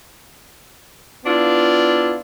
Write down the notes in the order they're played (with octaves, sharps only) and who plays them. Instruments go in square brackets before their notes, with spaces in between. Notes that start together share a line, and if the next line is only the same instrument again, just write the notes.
[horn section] B3 D4 E4 F4